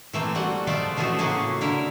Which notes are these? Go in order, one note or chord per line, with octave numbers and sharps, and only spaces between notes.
E3 A3 A#3 C4
G3 F#4 F#5
F3 G#3 A3 F4 D5
C#3 E3 F3 A3 F#4 G#4
A2 C#3 A#3 C#4 F#4 G#4
D3 E4 A#4